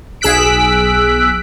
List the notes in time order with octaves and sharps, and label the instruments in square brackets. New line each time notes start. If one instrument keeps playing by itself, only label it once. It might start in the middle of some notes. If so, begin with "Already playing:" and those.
[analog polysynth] B1 G#4 E6 F#6 B6 D7